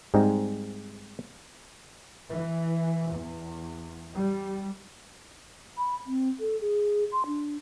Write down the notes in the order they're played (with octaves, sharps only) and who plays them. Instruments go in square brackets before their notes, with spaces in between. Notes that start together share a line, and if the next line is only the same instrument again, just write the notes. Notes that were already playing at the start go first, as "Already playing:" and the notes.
[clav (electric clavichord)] G#2 G3 G#3 C4 D#4
[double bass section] E3
E2
G3
[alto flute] B5
C4
A4
G#4
C6
D4